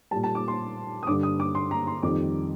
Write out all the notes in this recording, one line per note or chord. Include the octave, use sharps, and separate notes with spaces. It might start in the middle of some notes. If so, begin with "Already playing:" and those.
A#2 G3 A5
A5
D6
C6
D#6
G2 D3 G3 D6
D#6
D6
C6
A#5
C6
F2 D#3 G3 D6